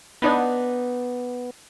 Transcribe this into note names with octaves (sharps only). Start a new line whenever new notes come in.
B3 D4 D#4 B4